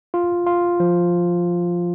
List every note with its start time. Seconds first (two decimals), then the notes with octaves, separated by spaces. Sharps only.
0.14 F4
0.46 F4
0.80 F3